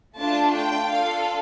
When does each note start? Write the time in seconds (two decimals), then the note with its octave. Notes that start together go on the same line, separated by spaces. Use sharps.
0.18 A3 D4 F4 A5
0.54 G5
0.90 D4 F4 A4 F5